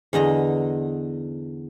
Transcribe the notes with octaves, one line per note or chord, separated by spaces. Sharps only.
E2 D3 D#5 A#5